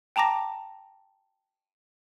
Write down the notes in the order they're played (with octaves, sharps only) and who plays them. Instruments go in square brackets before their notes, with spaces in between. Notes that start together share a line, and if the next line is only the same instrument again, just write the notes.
[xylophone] G5 A5 A#5 D6 A#6